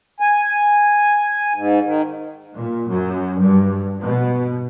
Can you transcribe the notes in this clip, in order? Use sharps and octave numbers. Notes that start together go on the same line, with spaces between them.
G#5
G#2
D#3
A#2
F#2
G2
B2